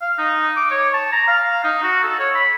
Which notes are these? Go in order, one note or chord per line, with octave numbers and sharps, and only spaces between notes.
F5
D#4
D6
C#5
A5
A#5
F5
D#4
F#4
A4
C#5
B5